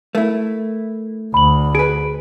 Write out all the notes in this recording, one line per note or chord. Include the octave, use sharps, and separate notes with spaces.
A3 E4 A#4
D2 B5 F#7
G#4 B4 D7